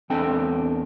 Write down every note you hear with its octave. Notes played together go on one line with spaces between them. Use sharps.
E2 C4 D4 A4 G5